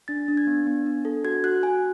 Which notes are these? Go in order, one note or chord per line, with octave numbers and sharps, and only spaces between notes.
D4 A6
D4
G#6
B3
B3
D4
A4
F#4 G#6
F#4 F#6
F#4 G#5